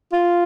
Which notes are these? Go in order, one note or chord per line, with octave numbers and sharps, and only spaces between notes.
F4